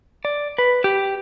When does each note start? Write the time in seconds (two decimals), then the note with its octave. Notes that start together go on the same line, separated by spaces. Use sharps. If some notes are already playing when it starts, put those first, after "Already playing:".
0.25 D5
0.58 B4
0.84 G4